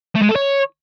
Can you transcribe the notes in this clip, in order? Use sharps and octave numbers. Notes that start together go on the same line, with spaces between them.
A3
G#3
A4
C#5